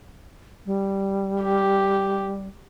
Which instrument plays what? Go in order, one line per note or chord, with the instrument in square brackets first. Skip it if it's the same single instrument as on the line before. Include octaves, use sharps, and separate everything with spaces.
[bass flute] G3
[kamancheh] G4